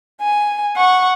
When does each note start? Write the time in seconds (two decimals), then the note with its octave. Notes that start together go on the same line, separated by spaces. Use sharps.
0.21 G#5
0.77 F#5 C#6